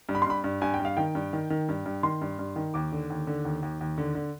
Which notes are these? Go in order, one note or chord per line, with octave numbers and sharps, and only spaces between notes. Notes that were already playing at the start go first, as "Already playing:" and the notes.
G2
B5
C6
G2 B5
G2
G2 G#5
G5
G2
F5
D#3 G5
G2
D#3
D#3
G2
G2
D#3 C6
G2
G2
D#3
D#2 D6
D3
D#2
D3
D#2
D#2
D#2
D3
D3